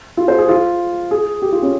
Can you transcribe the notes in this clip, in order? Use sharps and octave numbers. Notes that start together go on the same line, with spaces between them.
F4
C5
G#4
F4
G#4
G4
F4
C#4